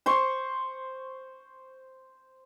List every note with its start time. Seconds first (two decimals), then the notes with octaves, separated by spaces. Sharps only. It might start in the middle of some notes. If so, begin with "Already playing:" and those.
0.06 C5 C6 C#6